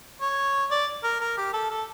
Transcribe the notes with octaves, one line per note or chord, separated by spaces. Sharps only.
C#5
D5
A#4
A#4
G4
A4
A4